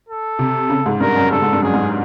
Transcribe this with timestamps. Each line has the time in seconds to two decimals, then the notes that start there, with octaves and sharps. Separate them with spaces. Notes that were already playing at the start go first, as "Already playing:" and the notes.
0.09 A4
0.39 C3
0.70 C#3
0.86 G#2
1.00 G2 A#4
1.16 F#2
1.31 G2 A4
1.42 G#2
1.53 G2
1.63 F#2 G#4
1.74 G#2